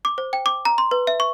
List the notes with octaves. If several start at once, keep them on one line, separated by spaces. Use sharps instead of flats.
D6
C5
G5
D6
A#5
C6
B4
E5
C#6